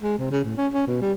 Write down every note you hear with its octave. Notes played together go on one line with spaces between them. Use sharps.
G#3
C3
C#3
A2
C#4
C#4
B2
G3